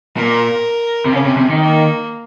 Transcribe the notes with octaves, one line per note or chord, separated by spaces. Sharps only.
A#2 A#4
C3
C#3 C#4
C3
C3
D#3
A#3